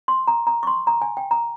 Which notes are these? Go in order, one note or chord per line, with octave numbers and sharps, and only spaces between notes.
C6
A#5
A#5
C#6
C6
A#5
G#5
G5
A#5